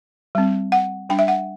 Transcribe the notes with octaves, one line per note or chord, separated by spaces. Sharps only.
G3 C4
F#5
G3 D4 G5
E5
F#5